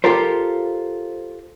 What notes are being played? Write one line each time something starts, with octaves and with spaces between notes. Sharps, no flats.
F4 G4 A4 A#4 C5